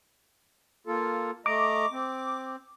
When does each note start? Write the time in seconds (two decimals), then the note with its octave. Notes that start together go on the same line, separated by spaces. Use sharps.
0.87 A#3 F4 A4
1.46 A3 D#5 A#5 D6
1.91 C4